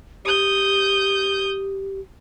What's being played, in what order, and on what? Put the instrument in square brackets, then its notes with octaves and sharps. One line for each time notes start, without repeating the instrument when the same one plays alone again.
[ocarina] G4 [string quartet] D#6 G6